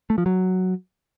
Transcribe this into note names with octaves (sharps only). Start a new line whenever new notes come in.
A3
F3
F#3